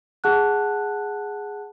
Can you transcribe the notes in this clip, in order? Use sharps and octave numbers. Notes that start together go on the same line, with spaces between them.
G#4 F#5 A5 F#6